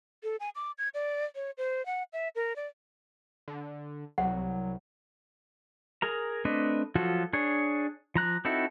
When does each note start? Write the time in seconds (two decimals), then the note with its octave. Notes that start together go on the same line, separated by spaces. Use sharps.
0.24 A4
0.40 G#5
0.56 D6
0.78 G#6
0.94 D5
1.35 C#5
1.58 C5
1.86 F#5
2.13 E5
2.35 A#4
2.56 D5
3.48 D3
4.18 C2 F#3 F#5
6.02 G#4 A#4 A#5
6.45 A3 C4 D4 B4 D#5
6.95 F3 F#3 F4 F#4 A4
7.33 D4 G#4 C#5
8.15 F3 A#5 F#6
8.45 C4 D#4 E4 F#4 A4